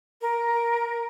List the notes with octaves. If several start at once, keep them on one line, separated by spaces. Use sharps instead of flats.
A#4